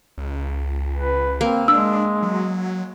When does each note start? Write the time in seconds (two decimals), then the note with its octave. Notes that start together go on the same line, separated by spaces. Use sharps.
0.18 C#2
0.97 B4
1.41 A#3 C4
1.68 G#3 D4 E6
2.22 F#3